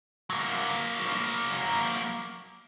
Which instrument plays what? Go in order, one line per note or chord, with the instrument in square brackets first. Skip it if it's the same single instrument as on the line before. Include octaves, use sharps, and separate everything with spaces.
[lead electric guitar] F#3 A#3